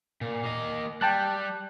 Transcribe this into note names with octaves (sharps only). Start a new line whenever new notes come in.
A#2
A#3 D#5
G3 G5 A5 F#6